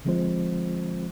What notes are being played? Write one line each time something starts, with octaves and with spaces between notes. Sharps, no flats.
D3 F3 G#3 C4 F4 C5